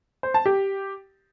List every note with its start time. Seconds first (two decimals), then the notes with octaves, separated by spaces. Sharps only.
0.23 C5
0.34 A5
0.46 G4